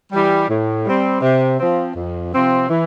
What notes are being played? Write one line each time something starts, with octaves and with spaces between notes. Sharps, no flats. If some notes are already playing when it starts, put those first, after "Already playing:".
E3 G3
A2
G3 C4
C3
F3 C4
F2
C3 F3 C4
E3